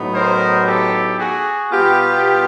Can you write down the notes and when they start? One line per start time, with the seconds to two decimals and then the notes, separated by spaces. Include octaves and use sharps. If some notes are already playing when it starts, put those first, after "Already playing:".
Already playing: A2 F#3 B3 D#4
0.14 A#4 C5
0.67 G4 A4
1.20 F#4 G#4
1.72 B2 G3 B3 F4 G4